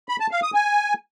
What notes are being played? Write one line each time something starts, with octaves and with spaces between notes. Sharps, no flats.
B5
A5
F5
D#6
G#5